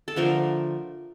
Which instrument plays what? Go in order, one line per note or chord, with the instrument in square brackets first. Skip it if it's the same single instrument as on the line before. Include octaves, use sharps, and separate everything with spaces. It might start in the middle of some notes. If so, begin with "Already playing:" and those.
[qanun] A4
D3 F3 A3 A#4